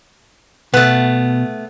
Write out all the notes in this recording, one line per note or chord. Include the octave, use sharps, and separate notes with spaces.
B2 A3 B3